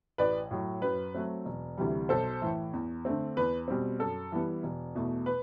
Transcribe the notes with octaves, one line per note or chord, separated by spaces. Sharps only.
A1 B4 D5
A2 F#3
F#2 B4
F#3 A3 C4
E1
D2 C3 E3 G3
B1 A4 C5
A2 E3 A3
E2
D3 A3 C4
E2 B4
B2 G3 C4
F#2 A4
E3 G3 B3
E1
E2 B2 A3
B4